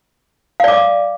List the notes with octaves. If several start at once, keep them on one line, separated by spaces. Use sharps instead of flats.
D5 F5 D6